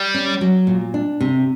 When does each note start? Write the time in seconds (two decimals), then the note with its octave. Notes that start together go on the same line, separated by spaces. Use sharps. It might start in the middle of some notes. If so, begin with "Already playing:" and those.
Already playing: G3
0.14 C#4
0.41 F#3
0.67 A#2
0.94 D4
1.20 C3